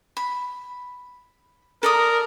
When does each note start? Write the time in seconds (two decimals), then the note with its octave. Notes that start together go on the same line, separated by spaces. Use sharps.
0.17 B5
1.83 A4 A#4 D5 D#6